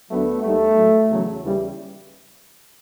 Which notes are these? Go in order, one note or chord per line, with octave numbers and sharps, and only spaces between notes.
D2 D3 F#3 A3 B3
D#2 D#3 G3 A3
A2 F#3
E2 C#3 F#3
D#2 C#3 E3 G3